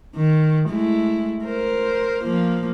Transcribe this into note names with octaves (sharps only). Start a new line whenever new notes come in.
D#3
G#3 A3 E4
A#4 C5
F3 A#3